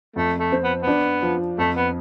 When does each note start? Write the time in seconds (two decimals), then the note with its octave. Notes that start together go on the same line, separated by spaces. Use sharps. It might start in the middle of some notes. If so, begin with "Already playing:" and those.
0.16 F2 A3
0.39 A3
0.52 C4
0.63 B3
0.82 B3 D4
1.22 F3
1.58 F2 A3
1.76 B3